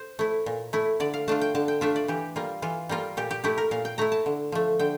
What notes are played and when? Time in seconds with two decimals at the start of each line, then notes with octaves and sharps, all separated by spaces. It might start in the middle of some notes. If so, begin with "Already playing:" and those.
Already playing: C5
0.19 A3 E4
0.46 A#2
0.73 A3 E4
1.00 D3 D5
1.14 F5
1.28 A3 D4 F4 A5
1.41 G5
1.55 D3 A5
1.68 G5
1.81 A3 D4 F4 E5
1.96 D5
2.08 E3 G4
2.36 G3 A#3 F4
2.62 E3 F4
2.89 G3 A#3 F4
3.17 A#2 G4
3.31 G4
3.44 A3 E4 G4
3.58 A#4
3.71 A#2 F5
3.85 G5
3.98 A3 E4 A#5
4.12 A5
4.26 D3
4.52 F3 A3
4.79 D3 G5